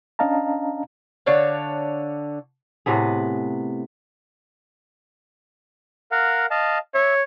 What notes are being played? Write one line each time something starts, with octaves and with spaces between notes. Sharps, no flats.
C#4 D4 D#5 F5 A5 A#5
D3 D4 C#5 F5
A2 C3 B3 G#4
A#4 F5 F#5
D#5 F5 A5
C#5 E5